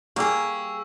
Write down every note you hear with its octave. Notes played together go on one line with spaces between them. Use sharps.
G3 A#3 G4 G#4 C#6 E6